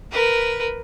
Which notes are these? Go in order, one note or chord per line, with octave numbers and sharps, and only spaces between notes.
A#4 B4